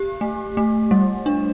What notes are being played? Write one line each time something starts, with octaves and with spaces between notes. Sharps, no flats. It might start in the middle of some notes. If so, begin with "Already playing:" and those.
Already playing: G4
A3
A3
G3
D4